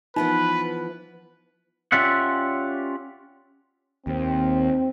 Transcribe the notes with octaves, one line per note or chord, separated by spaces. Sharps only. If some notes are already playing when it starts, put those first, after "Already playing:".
E3 F3 B3 D#4 B4
C#4 F4 G4 D5 E5 F#5
D#2 C4